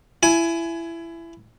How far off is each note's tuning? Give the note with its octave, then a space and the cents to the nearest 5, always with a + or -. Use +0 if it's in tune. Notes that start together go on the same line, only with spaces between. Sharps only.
E4 +20 G#5 +15